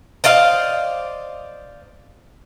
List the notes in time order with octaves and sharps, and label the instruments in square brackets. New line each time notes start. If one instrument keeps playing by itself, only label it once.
[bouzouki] C5 D5 D#5 F5